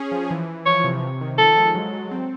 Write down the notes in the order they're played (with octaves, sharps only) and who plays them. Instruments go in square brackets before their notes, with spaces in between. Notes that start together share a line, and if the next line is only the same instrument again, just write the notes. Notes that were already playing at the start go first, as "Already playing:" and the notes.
Already playing: [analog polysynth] C#4 G#4
F3
E3
E3
[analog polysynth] F3 [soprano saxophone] C#5
[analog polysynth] C3
C3
D#3
[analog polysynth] F3 [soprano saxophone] A4
[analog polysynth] G#3
F#3
F#3
C4